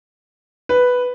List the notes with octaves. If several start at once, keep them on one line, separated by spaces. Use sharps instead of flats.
B4